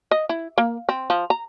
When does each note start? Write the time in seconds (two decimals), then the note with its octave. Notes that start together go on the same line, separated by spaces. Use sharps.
0.11 D#5
0.29 E4
0.58 A#3
0.89 C4
1.10 F3
1.30 A#5